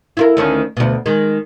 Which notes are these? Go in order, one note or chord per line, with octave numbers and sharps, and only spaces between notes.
E4 F4 A#4
D2 D#3 C#4
D2 B2
D#3 G#3